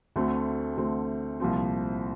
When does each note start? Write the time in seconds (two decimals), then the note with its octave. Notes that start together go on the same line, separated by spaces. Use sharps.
0.16 D2 D3 A3 C4
0.78 D2 D3 A3 C4
1.40 C2 A#2 F3 C4